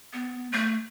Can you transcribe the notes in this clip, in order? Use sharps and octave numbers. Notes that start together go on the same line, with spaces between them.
B3
A3